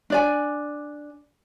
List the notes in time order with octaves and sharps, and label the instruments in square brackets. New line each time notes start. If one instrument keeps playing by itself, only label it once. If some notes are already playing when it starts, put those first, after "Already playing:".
[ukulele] D4 D5 G#5